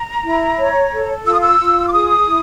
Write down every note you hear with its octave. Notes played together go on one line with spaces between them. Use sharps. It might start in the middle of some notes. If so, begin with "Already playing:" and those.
Already playing: A#5
E4
C#5
A4
F4 E6
D#6
E6
F4
D6
G#4 D#6
E4